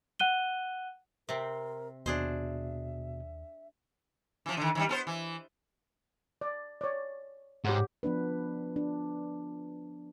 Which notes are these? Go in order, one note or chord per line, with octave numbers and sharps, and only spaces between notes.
F#5 F#6 D#7 G7
C3 C4 A#4
D#2 B2 D4 G#4 C5 E5
E3 F3
D3 D#3
D#3 F3 G3
B3 A4 C5
E3
D5
C#5 D5
G#2 G4 C#5 F#5
F3 B3 D4 B4
D4